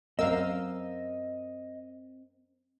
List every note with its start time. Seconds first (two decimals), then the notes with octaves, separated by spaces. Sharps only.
0.19 F#2 C4 A#4 D#5 F5 E6